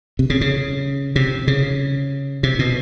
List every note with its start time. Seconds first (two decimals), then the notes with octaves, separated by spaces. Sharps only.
0.19 C3
0.30 C#3
0.41 C#3
1.16 C3
1.47 C#3
2.43 C3
2.59 B2